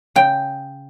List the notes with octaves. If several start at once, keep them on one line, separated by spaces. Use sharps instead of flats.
C#3 G5